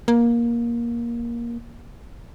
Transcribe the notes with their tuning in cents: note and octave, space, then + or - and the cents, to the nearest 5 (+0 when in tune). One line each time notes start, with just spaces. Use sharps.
A#3 +15